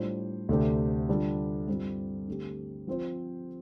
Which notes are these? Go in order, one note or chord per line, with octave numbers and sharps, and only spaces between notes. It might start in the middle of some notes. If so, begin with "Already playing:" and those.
Already playing: A2 G3 D4 F4 C5
D2 C3 A3 D4 G4
D3 G3 D4 F4 A4
G2 G3 C4 F4
D3 A3 C4 G4
F3 C4 F4 C5